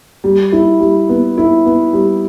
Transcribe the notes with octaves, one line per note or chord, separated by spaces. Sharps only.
G3
E4
G3
B3
E4
B3
G3